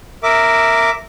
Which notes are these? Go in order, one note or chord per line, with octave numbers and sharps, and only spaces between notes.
A#4 E5 D6